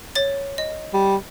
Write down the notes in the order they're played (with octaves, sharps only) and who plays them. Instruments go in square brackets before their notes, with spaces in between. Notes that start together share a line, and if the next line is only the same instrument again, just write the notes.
[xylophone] C#5 A6
D#5
[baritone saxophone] G3